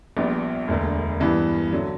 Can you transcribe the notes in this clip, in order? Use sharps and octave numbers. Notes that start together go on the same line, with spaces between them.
A#1 A#2 G3 B3
E1 D2 D3 A#3
G2 E3 B3 E4
D3 F#3